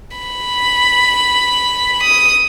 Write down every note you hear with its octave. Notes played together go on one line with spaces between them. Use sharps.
B5
D#6